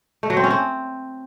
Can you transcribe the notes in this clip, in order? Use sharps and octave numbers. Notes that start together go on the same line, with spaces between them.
A3
F#3
C4
C#4
C4